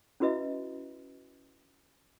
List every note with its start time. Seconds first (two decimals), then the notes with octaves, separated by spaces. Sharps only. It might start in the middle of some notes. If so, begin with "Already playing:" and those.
0.20 C#4 E4 F#4 B4 D#5 E5